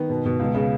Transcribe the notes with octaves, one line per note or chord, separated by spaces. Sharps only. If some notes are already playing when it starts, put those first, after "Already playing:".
Already playing: D#3 B3
B2
B2
C#2
C#3